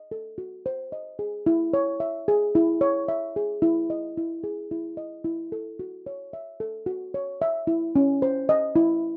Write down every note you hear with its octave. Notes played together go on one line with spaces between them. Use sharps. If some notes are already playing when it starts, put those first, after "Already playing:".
Already playing: D#5
A4
F#4
C5
D#5
G#4
E4
C#5
E5
G#4
E4
C#5
E5
G#4
E4
D#5
E4
G#4
E4
D#5
E4
A4
F#4
C#5
E5
A4
F#4
C#5
E5
E4
C#4
C5
D#5
E4